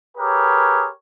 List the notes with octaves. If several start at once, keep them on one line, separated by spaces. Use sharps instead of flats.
G4 G#4 A#4 B4 C#5